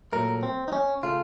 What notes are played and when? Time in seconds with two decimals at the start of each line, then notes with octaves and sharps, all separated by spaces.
0.13 A#2 F#3 A3 A#4
0.43 C4
0.68 D#4
0.73 C#4
1.03 C#3 A3 F4